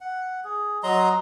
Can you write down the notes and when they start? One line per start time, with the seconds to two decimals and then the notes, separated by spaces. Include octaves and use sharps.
0.01 F#5
0.44 G#4
0.83 F#3 D#5 A#5 C6